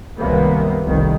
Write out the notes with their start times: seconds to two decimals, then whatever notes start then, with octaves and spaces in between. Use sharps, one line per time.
0.18 C2 F#2 C3 D#3 A#3 B3
0.84 F1 C2 D#3